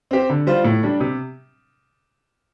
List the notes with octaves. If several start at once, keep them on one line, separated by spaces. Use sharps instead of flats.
C4 G4 C5
D3
G3 F4 C5
A2
G3 D4
C3